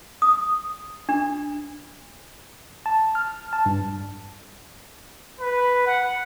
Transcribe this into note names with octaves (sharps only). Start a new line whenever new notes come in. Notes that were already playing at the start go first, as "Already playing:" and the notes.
D#6
D4
A5
F6
A5
G2
B4
F#5